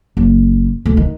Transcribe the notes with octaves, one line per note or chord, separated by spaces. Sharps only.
F#1
D2
D#3